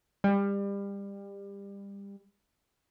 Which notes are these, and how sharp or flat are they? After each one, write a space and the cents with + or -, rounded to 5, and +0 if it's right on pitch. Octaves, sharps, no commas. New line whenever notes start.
G3 +25